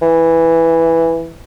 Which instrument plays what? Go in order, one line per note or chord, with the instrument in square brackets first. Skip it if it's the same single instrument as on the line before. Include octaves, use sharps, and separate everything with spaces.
[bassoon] E3